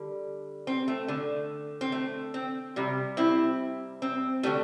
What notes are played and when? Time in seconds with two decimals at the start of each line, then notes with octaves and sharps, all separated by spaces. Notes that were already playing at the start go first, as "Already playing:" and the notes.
Already playing: D3 G3
0.67 C4
0.88 A3
1.08 D3 A3
1.81 C4
1.92 A3
2.34 C4
2.76 C3 G3
3.17 C4 E4
4.02 C4
4.43 D3 G3 A3